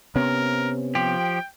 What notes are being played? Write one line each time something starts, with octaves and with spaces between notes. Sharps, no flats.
C3 B3 C#4 A#4
F3 G4 G5